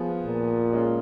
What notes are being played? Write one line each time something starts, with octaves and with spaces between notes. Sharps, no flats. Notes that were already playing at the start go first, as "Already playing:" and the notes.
Already playing: F3 B3 F4 G#4
A#2
G#3 C#4 F4